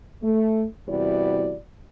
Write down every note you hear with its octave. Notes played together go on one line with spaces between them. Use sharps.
A3
E2 C3 G3 E4 F#4 D5